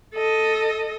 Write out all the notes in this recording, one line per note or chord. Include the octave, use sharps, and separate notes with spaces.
A4 D#5